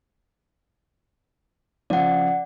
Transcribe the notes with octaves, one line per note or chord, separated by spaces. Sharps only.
C#3 F3 D5 F#5